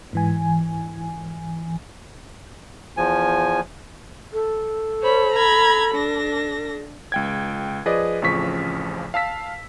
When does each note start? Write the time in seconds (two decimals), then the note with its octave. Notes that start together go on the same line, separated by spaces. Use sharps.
0.13 G#2 E3 G#5
2.97 E2 F3 G#5
4.33 A4
5.01 C5 C#5 B5
5.32 A#5 B5 G#6
5.93 D4 A#6
7.12 C#2 G5 G#6
7.86 F3 G#4 B4 D5 D#5
8.22 A1 F2 C#3 F3 C#6 B6
9.14 F5 A5 E6 B6